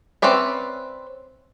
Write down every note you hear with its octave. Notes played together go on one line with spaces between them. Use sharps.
C4 C#4 B4 D5 E5